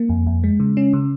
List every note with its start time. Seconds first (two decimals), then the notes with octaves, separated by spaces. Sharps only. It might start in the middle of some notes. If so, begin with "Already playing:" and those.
Already playing: A#3
0.09 F2
0.27 F2
0.44 G#3
0.60 C#3
0.77 C#4
0.93 C#3